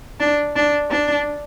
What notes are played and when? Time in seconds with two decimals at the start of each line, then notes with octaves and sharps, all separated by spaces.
0.20 D4
0.56 D4
0.91 D4